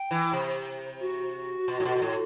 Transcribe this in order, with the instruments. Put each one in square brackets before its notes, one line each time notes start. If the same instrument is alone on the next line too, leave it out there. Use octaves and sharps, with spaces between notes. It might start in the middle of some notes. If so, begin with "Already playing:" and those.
Already playing: [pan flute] G5
[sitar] E3
C3
[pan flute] F#4
[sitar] B2
A2
B2
B2
A2